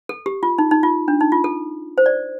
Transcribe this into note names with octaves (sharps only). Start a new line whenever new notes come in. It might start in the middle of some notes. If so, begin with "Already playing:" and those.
A4
G4
F4
D#4
D#4
F4
D4
D#4
F4
A4
C5
D5